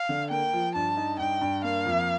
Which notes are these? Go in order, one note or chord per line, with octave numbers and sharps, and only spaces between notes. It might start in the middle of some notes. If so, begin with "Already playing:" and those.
Already playing: F5
D3
A#3 G5
F3
G2 A5
D#4
G2 G5
G2
A#3 F5
F2